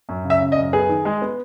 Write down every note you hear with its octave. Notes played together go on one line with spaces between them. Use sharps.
F#2
C#3
E5
C#3
D#5
F#2
B3 G#4
D#3
G#3
B3